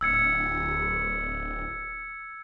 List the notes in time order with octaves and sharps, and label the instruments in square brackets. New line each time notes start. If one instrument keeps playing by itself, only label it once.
[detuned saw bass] D1 [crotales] E6 G#6 C#7